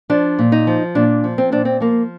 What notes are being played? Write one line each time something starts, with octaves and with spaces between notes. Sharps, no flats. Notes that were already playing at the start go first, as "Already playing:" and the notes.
F3 D4
A#2
D#4
F3
A#2 D4
F3
C4
A#2 D4
C4
F3 A#3